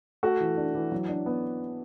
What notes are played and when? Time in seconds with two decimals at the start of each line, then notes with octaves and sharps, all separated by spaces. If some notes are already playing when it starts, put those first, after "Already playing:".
0.23 A3 F#4
0.40 E3
0.57 D4
0.75 E3
0.92 F#3
1.09 D4
1.26 B3